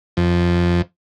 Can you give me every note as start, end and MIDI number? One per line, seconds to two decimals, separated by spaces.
0.17 0.82 41